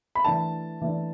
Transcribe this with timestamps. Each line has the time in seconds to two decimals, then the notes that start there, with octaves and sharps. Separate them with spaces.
0.15 B5
0.24 E3 A3 D4 A5
0.81 E3 A3 D4